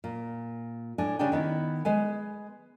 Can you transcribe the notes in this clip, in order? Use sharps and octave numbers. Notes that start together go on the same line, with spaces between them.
A#2
A2 D4 G#5
C#3 G3 D4 G#4 D5 G5
D#3 B3 E4
G#3 B4 G#5